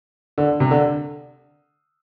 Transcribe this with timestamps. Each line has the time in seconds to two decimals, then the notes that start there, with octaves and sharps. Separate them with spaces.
0.38 D3
0.60 C3
0.71 D3